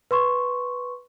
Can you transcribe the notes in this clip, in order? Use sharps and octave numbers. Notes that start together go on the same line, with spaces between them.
B4 C6 C#6